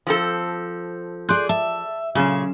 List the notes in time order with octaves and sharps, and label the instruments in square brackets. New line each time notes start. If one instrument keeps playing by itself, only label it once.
[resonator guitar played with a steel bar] F3 C4 A4
[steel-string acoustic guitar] G#4 D5 [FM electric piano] C6 F#6 G6
[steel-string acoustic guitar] E5 [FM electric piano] A5
[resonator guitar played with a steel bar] A#2 C#3 [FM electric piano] F#3 C#4 [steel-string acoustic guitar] G#4